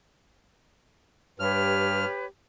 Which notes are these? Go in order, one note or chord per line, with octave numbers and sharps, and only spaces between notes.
G2 G4 B4 C#5 F6